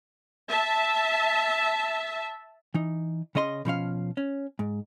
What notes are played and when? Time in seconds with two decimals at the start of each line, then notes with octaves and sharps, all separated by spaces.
0.49 E5 A5
2.74 E3 D#4
3.35 C#3 C#4 D#5 C6
3.65 B2 F3 C#4 F5
4.17 C#4
4.59 G#2